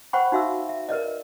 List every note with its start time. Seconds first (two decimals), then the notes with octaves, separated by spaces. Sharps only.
0.13 B4 C5 F#5 G5 B5 C#6
0.32 D#4 F#4 E5 F5 E6
0.69 E5
0.89 A#4 B4 D5 D#5